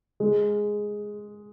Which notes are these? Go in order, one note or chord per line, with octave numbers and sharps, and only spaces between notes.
G#3